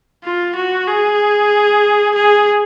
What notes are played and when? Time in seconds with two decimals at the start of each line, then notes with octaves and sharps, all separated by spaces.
0.24 F4
0.56 F#4
0.87 G#4
2.15 G#4